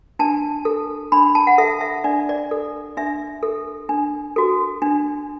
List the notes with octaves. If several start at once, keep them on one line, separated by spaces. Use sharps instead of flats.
D4 A5
A4
D4 B5
A5
F#5
A4 E5
E5
D4 D5
D5
A4
D4 E5
A4
D4
F#4 A4
D4